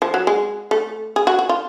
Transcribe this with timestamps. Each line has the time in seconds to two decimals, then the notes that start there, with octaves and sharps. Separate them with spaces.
0.02 F3
0.14 F#3
0.27 G#3
0.71 A3
1.16 G#4
1.27 F#4
1.39 F#4
1.49 F4